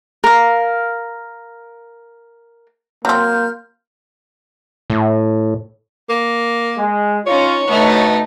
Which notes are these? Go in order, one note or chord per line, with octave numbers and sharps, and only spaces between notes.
A#4 F5
F#3 A#3 C4 C6 F6 G6
A2
A#3
G#3
C#4 D#4 F4 C#5
D2 B2 A3 B3 D#4